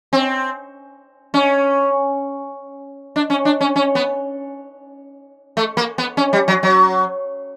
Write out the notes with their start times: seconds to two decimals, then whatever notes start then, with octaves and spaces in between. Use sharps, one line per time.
0.13 C4
1.34 C#4
3.16 D4
3.30 C#4
3.45 D4
3.61 C#4
3.76 C#4
3.95 B3
5.57 A3
5.77 A#3
5.98 B3
6.17 C#4
6.33 G3
6.48 F#3
6.63 F#3